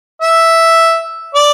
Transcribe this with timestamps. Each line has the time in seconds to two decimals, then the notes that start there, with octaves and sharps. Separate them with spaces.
0.22 E5
1.35 D5